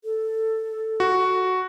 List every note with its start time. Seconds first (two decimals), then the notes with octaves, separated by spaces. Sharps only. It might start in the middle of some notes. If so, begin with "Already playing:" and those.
0.04 A4
1.00 F#4